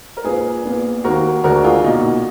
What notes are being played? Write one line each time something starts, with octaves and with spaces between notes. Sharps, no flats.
A#4
A#1 A#2 F3 A#3 G#4 B4
A#1 A#2 F3 B3
D#2 D#3 A#3 F#4 A#4
D2 D3 G#3 F#4 A#4
F4 G#4
B1 A#2 F3 A#3 D#4 F#4